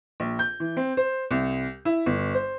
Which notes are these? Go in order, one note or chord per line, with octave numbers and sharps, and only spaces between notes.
A#1
G6
E3
C4
C5
C2
E4
G1
C5